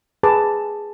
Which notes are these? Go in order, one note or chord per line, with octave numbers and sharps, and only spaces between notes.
G#4 B4 A5 D6